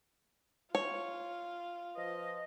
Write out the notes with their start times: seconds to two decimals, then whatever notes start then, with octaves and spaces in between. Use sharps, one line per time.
0.75 F4 C#5
1.95 F3 B4 D#5